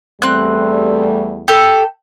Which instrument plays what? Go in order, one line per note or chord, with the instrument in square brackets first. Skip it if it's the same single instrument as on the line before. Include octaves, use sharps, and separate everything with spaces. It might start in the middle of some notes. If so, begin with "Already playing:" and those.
[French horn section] E2 G3 A3 [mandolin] C4 F#6
[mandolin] G4 A4